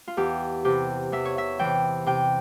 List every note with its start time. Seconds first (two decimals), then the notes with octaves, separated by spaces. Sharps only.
0.08 F4
0.17 E2 G4
0.64 C3 E3 G4
1.12 E2 E5
1.25 C#5
1.38 E5
1.59 C3 E3 G5
2.06 C3 G5